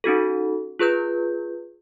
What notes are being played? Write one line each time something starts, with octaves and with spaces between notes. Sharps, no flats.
C#4 D#4 F#4 A4
F4 G#4 B4 G6